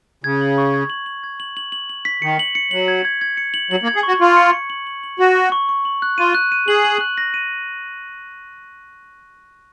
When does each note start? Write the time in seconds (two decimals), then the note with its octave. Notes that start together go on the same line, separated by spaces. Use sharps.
0.24 C#3 G#6
0.41 F#7
0.58 C#6
0.74 G#6
0.90 F#7
1.06 F#7
1.24 G#6
1.40 F#7
1.57 F#7
1.72 F#7
1.90 F#7
2.05 B6
2.22 D#3 C#7
2.39 F#7
2.55 C#7
2.71 F#3 F#7
2.88 G#6
3.05 G#6
3.21 G#6
3.37 C#7
3.54 F#7
3.71 F#3 F#7
3.83 A#3
3.87 G#6
3.96 G#4
4.03 F#4 C#6
4.20 F4 C#6
4.37 C#7
4.53 C#7
4.70 F#7
4.87 F#7
5.03 F#7
5.19 F#4 F#7
5.35 C#6
5.52 C#6
5.69 C#6
5.85 F#7
6.02 F#6
6.18 F4 D#7
6.35 F#6
6.52 D#7
6.68 G#4 F#7
6.84 F#7
7.01 F#6
7.18 A#6
7.34 D#7